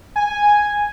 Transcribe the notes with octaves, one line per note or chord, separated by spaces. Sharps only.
G#5